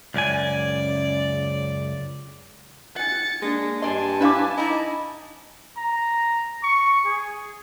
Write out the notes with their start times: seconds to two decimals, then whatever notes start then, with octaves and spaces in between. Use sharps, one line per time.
0.14 C#2 F#2 C#3 D5 G#5
2.96 F#5 G#5 A6 C#7
3.42 G#3 A#3 D4
3.82 G2 D4 D5 D#5 G#5 A5 C6
4.21 C#3 D4 E4 B4 F5 D6
4.57 D#4 E4 D#5
5.78 A#5
6.63 C#6
7.05 G#4